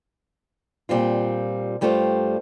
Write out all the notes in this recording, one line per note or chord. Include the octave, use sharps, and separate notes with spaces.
A#2 G3 C4 F4
G2 G3 A3 F4 A4 C5